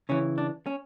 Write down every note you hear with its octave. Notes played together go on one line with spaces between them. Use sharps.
C#3 E3 C#4
D4
C#4